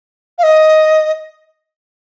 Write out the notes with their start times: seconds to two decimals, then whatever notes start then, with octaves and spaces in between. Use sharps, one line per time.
0.38 F5
0.43 D#5